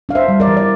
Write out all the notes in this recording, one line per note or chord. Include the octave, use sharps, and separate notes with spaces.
D4 F5
C5 E5
G3
A#4 D5
E3
D5